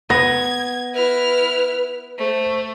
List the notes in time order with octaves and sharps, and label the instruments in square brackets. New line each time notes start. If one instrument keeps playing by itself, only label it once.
[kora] B3 [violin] G#6 [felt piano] A#6
[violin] E4 F6 [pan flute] B4
[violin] A3 [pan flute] C5